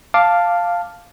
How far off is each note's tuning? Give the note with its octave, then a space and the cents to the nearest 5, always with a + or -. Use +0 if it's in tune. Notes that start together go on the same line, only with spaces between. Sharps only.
F5 +0 A5 +5 D6 +0